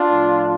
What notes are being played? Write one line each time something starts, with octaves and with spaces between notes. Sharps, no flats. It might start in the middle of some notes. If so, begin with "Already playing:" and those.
Already playing: D4 F4
A2 F3